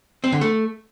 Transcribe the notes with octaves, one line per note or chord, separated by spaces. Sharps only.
C4
D3
A3